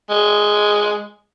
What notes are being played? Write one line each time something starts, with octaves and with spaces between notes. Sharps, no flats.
G#3